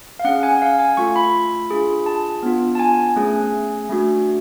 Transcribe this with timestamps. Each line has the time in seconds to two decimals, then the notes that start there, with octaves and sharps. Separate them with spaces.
0.19 F5
0.24 C#4 G#4 F#5
0.43 G#5
0.62 F5
0.79 G#5
0.97 A3 F4 A4 C#6
1.16 B5
1.70 D4 F4 G#4
2.06 A5
2.43 B3 D4 F4
2.75 A5
2.79 G#5
3.16 A3 C#4 G#4
3.89 A3 D4 F#4